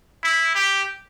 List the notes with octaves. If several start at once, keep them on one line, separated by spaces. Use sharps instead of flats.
E4
G4